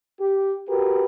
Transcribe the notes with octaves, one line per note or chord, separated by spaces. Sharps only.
G4
F#4 G4 A#4 B4